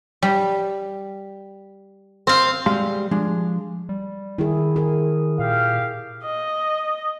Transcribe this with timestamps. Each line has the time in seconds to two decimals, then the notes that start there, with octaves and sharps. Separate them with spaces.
0.22 G3
2.27 C4 F5
2.66 G3 G#3 F5 C6
3.11 F3 G#3 D4
3.89 G3
4.38 D#3 E4 G#4
4.76 G#4 A#4
5.39 A#2 G4 F5
6.25 D#5